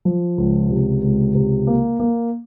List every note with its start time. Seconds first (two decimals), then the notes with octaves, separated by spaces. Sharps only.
0.05 F3
0.38 C#2
0.70 C3
1.02 C#2
1.35 C3
1.67 A#3
1.99 A#3